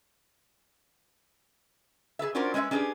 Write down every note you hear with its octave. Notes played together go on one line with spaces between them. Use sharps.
G#4 A4 B4 E5
C#4 D4 F4 F#4 A#4 C5
G#3 C#4 B4 C#5 E5
C#4 D4 G4 G#4 B4